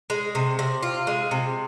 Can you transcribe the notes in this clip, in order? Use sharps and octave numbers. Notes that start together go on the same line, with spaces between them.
G#3
C3
C3
F4
G#3
C3